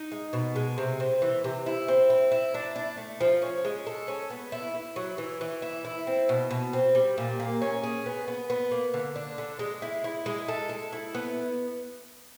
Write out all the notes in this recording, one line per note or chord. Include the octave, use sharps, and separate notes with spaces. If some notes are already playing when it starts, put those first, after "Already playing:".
Already playing: D#4
G#3
B2
G#3
C3
C4
E3
C3
E4
C4
E4
E4
D4
D4
A3
F3
C#4
G#3
A4
C#4
B3
E4
E4
F#3
E3
E3
E4
E4
C4
B2
B2
C4
G3
A#2
A#3
C#4
G#4
B3
B3
B3
A#3
D3
D4
D3
G#3
E4
E4
G#3
A4
A4
E4
B3